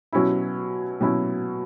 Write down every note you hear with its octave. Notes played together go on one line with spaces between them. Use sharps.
B2 F#3 C#4 E4
B2 F#3 C#4 E4